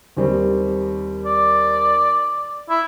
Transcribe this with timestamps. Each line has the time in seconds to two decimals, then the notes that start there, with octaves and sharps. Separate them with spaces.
0.17 D#2 G3 C4
1.26 D5
2.70 E4